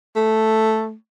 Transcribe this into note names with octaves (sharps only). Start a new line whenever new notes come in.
A3